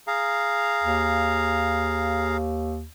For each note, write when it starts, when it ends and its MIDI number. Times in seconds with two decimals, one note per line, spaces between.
0.07 2.37 68
0.07 2.37 77
0.07 2.37 82
0.84 2.87 39